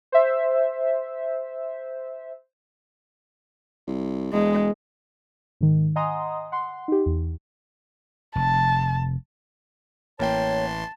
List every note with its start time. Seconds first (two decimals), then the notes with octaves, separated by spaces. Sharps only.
0.12 C5 E5
3.87 C2
4.33 E1 G#3
5.61 G#2 D#3
5.96 D#5 F#5 G#5 A#5 C6 D#6
6.52 F#5 C6
6.88 D#4 G4
7.06 E2
8.35 F1 A5
10.19 A1 E3 A#3 C#5 G5 A5 C6